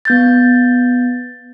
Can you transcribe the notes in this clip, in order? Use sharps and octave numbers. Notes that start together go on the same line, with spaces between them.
B3 G6 A6